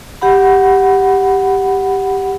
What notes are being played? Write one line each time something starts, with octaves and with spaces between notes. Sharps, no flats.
G4 F#5 B5